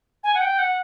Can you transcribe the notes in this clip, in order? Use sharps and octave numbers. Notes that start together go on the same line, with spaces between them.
G#5
F#5
G5
F#5